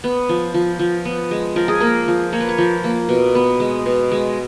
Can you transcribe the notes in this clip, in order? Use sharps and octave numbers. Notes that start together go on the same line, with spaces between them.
B3
F3
F3
F3
B3
G#3
F3 A#4
G#4
A#3 A#4
F3
A#3 C#5
B4
C#5
F3
A#3
B2
B3
G#3
B2
G#3